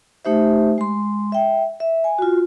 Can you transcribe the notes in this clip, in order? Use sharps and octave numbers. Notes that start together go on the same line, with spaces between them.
A3 D#4 G4 C5 E5
G#3 C6
E5 G5
E5
G#5
F4 F#4